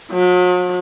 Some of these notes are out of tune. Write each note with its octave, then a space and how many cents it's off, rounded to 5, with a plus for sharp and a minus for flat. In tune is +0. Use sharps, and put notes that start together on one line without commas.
F#3 -45